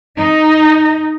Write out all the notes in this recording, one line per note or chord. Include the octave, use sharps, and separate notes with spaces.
D#4